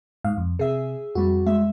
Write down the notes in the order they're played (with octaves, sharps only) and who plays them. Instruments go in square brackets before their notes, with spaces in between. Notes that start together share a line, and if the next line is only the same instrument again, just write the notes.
[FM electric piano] G#2 F5
F2
[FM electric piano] C3 [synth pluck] G#4 E5
[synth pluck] F2 G3 [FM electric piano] F#4
[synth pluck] G#3 E5